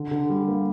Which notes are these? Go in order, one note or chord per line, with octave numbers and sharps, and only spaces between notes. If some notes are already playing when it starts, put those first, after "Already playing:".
Already playing: D3
D3
G3
A#3